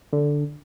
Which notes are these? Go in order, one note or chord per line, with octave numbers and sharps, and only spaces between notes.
D3